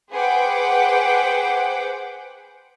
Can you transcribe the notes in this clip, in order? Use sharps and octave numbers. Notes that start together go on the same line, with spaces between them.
G#4 B4 C5 F#5 G5 D6